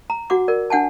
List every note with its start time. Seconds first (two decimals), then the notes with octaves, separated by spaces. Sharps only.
0.10 A#5
0.30 F#4 F#5 D6
0.48 A#4 D5
0.70 D4 F#5 G#5 A5